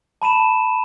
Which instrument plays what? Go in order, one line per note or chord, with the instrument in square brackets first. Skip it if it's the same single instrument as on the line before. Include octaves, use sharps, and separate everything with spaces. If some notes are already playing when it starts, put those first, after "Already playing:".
[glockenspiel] A5 B5 D#7 E7